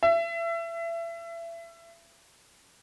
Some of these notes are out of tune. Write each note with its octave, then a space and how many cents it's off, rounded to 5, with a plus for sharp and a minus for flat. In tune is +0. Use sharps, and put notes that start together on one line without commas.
E5 +30